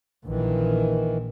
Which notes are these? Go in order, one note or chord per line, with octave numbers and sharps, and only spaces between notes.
A#1 D#3 E3